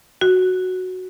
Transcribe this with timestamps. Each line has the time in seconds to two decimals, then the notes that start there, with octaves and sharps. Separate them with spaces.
0.21 F#4